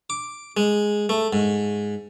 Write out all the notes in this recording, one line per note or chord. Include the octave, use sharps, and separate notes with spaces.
D6
G#3
A3
G#2